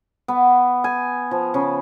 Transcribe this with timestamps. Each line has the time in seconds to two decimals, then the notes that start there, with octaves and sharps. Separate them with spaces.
0.28 B3
0.84 G#5
1.31 F3
1.54 C#3